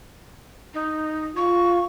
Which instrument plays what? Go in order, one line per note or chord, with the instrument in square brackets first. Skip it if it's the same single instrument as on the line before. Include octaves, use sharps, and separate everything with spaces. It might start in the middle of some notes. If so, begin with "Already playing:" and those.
[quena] D#4
[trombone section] F4 [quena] C#6